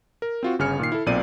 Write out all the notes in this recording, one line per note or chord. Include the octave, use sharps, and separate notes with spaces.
A#4
C4 F4 F#4
G1 C#3 G#5 F6 C#7
A#2 D#3 C7
E4 A4
B1 A#2 C4 D5 D#7